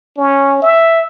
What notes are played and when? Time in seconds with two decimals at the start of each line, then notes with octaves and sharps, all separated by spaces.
0.17 C#4
0.62 E5